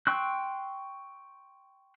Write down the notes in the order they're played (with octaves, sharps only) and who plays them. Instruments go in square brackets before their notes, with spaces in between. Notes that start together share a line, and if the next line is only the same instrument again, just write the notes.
[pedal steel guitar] G5 C6 C#6 E6 F#6